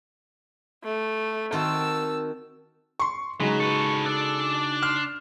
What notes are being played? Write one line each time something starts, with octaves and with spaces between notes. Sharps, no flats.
A3
D#3 C4 F#4 A5 E6
C6 C#6
C#3 F#3 G#3 D#4 F#4 B5
A4 B4 C#6
D4 A4 D5
C6 F6